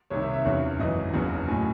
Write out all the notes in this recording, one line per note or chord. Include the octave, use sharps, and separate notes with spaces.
C2 C3 D#3 C#5
E5
E5
E2 C#3 F#3 C#5
G#1 F#2 E3 D#5
F#1 E2 C#3 F#3
A2 F#3 G#5